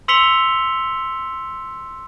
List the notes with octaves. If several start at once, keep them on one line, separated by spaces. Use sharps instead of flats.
C6 E6 B6 C#7 F7 G7